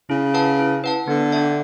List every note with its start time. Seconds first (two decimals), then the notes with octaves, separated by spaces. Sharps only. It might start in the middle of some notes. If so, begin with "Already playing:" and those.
0.10 C#3 E4
0.34 B4 F#5 A5
0.59 E4
0.84 B4 F#5 A5
1.08 D3 B3
1.32 D4 A4 E5 A5